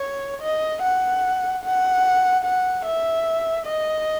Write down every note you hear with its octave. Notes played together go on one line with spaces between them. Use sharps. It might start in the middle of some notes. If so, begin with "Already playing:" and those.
Already playing: C#5
D#5
F#5
F#5
F#5
E5
D#5